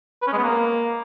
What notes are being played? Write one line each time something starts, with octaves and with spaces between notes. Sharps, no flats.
B4
C#4
G#3
B3
A#3